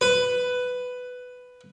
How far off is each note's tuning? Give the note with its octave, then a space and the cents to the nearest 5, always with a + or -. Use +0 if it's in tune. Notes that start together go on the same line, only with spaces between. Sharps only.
B4 +10